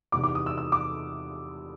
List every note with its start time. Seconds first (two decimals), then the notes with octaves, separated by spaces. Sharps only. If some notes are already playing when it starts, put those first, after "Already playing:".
0.12 E2 C3 D#3 D6
0.24 D6
0.35 D#6
0.46 E6
0.58 E6
0.72 D6